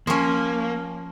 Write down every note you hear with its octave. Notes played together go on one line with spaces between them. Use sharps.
F3 A#3 C#4